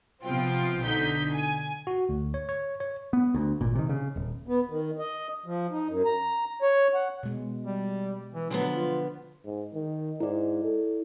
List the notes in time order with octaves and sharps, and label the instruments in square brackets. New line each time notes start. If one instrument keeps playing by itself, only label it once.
[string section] C3 F3 B3 C4 F4 G5
B1 D3 D#4 G6 B6
G#5
[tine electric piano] F#4
D2
C#5
C#5
C#5
[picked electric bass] B3
D2
G#1 A#2
C3 D#3
C#3
D#1
[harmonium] B3
D#3
D#5
F3
D#4
F#2
A#5
C#5
F#5
[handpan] B2 G#3
[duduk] G3
E3
[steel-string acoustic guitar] D3 F3 B3 [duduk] F#3
[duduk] F4
[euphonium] G#2
D#3
[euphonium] G#2 [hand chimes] E4 D5
[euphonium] A4